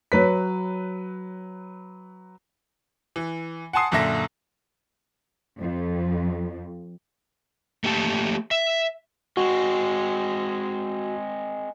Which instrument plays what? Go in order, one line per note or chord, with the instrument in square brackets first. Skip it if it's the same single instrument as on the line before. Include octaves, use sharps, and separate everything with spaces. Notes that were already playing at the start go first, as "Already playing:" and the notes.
[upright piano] F#3 B4 B6
[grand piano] E3
F#5 G#5 A5 C6 D#6 C7
F#2 A#2 D3 A4 E5 A#6
[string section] F2
[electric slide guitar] A3 A#3 G4 G5 A5
E5
[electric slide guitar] G#3 C4 [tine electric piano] F#4